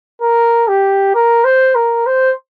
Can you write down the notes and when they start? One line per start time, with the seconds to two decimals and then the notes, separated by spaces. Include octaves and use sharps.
0.22 A#4
0.68 G4
1.15 A#4
1.45 C5
1.75 A#4
2.07 C5